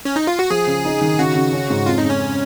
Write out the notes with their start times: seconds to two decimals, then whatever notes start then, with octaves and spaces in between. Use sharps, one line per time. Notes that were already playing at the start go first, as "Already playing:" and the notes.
0.05 C#4
0.16 D#4
0.27 F4
0.39 F#4
0.50 F3 G#4
0.67 C#3
0.85 D#4
1.01 D#3
1.19 C#3 F#4
1.35 C#3
1.53 C#4
1.70 G#2
1.86 F2 F4
1.98 D#4
2.04 C#3
2.10 C#4